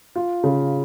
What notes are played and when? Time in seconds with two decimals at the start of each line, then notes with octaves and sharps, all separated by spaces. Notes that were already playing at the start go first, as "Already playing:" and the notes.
0.15 F4
0.44 C#3